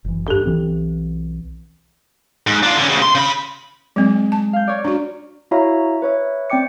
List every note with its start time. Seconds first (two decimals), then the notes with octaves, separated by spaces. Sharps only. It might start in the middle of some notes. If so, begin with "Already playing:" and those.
0.04 F#1 E3
0.28 G2 D4 G4 A4
0.46 B1 E3 C4
2.47 G#2
2.63 D4 F4
2.77 D3 C#4
2.90 D2 C#3
3.02 C6
3.15 C#3 B5
3.96 F#3 G#3 C4
4.32 A5
4.53 F5 G6
4.68 C#5 D5
4.84 D4 F#4
5.51 E4 F#4 C#5 E5 F5 A#5
6.02 B4 C#5 E5
6.50 C4 D5 G5 D6 C#7